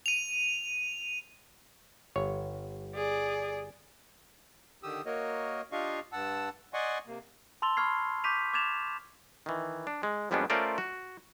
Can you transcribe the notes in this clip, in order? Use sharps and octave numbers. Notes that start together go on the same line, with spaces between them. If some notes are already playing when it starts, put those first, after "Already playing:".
D#7 F7
G1 C#5
G#4 D5
D3 D#3 G4 D#6 E6
A#3 F#4 A#4 C#5 D#5
D4 F4 G4 D#5 F5 C#6
G2 F#5 A5 E6
D5 D#5 F#5 G#5 C6 C#6
C3 A#3
A5 C6 E6 A6 F7 G7
B5 C#6 F6 G#6 C7
C#6 D6 G6 B6 D#7 F7
D6 F6 G#6 A6 E7 F7
D#3 E3
D4
G#3
F2 G3 G#3 B3 C#4 D4
A3 C#4 F4 A#4 C5 D5
F#4